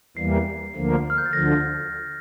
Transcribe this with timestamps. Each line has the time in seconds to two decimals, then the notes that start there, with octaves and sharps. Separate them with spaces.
0.17 E2 E3 G3 A#3 C7
0.75 D2 D3 F3 A#3
1.10 F6
1.18 G6
1.26 A6
1.33 D2 D3 F3 A#6